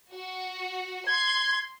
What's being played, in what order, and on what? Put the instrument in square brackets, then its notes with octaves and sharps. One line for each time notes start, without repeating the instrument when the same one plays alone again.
[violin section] F#4
[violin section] C6 [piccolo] G#6